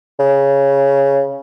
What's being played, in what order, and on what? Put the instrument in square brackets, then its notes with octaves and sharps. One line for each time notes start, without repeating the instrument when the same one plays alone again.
[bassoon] C#3